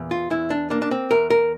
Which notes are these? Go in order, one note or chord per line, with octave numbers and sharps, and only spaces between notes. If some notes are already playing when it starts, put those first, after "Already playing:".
Already playing: E2 A#2
F4
E2 E4
D4
A#3 D4
D4
C4
E2 A#4
A#4